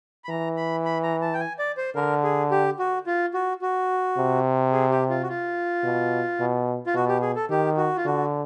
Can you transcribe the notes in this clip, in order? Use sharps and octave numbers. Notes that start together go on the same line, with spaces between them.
B5
E3 A#5
B5
B5
A#5
A5
G5
G#5
D5
C5
D3 A#4
G#4
G4
F#4
F4
F#4
F#4
C3
G#4
G4
F4
F#4
F4
B2
B2
F4
B2 F#4
G4
G#4
A4
D#3 G4
F#4
F4
D3 F#4